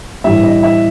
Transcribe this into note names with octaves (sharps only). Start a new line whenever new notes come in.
A2 E3 G3 E5
D#5
E5